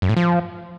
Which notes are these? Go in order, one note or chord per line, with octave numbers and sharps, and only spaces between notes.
F#2
A2
F3